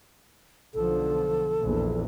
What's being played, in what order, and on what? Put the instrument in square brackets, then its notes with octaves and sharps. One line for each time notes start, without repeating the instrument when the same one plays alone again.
[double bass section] B1 D3 F3 [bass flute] A4
[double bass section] A#1 E2